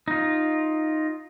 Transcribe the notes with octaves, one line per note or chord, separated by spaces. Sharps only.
D#4 F4